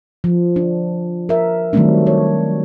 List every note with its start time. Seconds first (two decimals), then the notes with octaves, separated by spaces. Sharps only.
0.24 F3
0.56 D4
1.29 A#4 E5
1.73 D#3 F#3 G3 A3 C4 D4
2.07 C#5